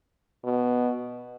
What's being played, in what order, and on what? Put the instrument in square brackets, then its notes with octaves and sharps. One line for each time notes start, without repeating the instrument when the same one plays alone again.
[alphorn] B2